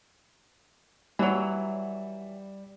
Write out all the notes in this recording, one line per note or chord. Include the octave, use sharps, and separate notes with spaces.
E3 F#3 G3